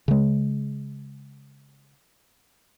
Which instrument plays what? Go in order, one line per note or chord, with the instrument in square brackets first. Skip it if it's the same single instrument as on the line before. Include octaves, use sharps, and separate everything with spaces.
[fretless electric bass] C#3 G#3